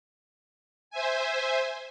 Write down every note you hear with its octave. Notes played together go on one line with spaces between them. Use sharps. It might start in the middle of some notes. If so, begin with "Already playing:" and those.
C5 E5 G#5